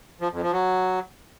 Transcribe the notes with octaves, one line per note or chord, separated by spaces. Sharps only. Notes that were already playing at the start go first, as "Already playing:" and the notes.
F3
F2
F3
F#3